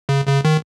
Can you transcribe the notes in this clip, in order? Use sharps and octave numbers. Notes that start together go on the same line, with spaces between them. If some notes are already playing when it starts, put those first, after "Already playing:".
C#3
C#3
D#3